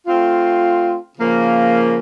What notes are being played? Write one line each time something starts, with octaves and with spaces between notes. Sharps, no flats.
A3 C4 F4
C#3 F3 A#3